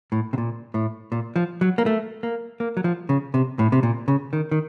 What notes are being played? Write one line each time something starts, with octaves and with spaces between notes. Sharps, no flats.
A2
C3
A#2
A2
A#2
F3
F#3
A#3
A3
A#3
A#3
F#3
F3
C#3
C3
A2
C3
A#2
C#3
D#3
D#3